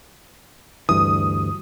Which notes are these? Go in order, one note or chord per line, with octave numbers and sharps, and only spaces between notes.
D2 G2 E3 D#6